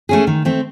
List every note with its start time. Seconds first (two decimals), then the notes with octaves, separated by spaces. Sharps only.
0.09 A3 C#4 G#4
0.27 D#3
0.45 A3 C4